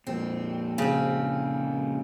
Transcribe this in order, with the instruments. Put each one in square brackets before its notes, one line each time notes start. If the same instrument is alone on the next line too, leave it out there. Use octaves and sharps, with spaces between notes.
[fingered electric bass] F2 A#2 [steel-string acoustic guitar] C4
[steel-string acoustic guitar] C#3 C4